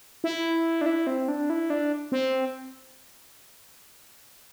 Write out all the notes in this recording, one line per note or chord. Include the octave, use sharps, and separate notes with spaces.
E4
D4
E4
C4
D4
E4
D4
C4